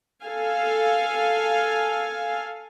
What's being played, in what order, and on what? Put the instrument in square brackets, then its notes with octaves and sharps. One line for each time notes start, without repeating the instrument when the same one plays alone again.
[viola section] A4 F5 G#5